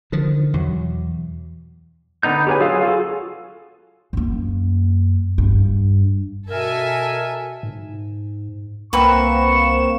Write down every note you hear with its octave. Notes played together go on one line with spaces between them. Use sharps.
D3 D#3 F3
E2 B2 F#3
D3 B3 D#4 G6
G4 G#4 B4 C#5 G#5
F#3 F4 G#4 A4 F5
F4 F#4 G#4 A4
F#2 A#3
G2
B2 A4 A#4 E5 G#5
G#2
C2 A#3 C4 F#4 B4 C#6 E7